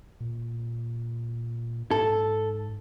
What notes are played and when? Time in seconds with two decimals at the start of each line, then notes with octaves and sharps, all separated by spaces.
0.20 A#2
1.91 G#2 A4